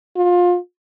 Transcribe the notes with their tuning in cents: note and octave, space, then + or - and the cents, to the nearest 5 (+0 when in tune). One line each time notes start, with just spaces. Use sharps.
F4 +25